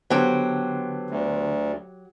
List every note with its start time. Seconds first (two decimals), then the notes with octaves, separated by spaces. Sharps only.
0.10 D3 F#3 B3 G4 A4 C5
1.10 D2